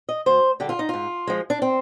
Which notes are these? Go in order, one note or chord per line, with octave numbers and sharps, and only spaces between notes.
D#5
D2 C5
D3 G3 G4
F4
D#4
G#2 F4
F3 G#3
D4
C4